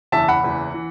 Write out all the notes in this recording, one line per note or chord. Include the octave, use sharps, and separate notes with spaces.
F#1 E2 E3 E5 A5
F#5 B5
F#1 E2 E3
E3